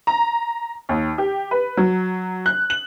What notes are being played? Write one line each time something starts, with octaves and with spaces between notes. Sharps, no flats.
A#5
D#2
G4
B4
F#3
F#6
F#7